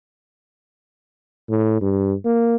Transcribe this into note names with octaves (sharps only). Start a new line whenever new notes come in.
A2
G2
A#3